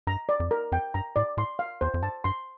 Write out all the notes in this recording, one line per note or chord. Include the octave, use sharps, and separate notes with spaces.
G2 A#5
D5
F2
A#4
F2 G5
G2 A#5
A2 D5
A2 C6
F5
E2 C5
F2
G2 A5
G2 C6